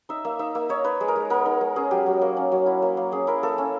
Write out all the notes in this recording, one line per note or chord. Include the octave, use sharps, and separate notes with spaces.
D#4 E5
A#3 E5
D#4 E5
A#3
D#4 C#5
D#4 B4
G#3
A#4
G#3
B3 A#4
D#4
G#3
C#4 G#4
F#3 G4
F#3
A#3
C#4
F#3
E4
A#3
A#3
C#4 G#4
E4 A#4
A#3 A4
C#4